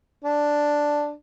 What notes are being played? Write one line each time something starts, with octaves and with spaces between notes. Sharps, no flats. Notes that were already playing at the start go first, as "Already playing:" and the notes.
D4